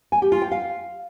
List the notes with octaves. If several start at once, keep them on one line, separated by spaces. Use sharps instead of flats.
G#5
G4
F4
G5
F5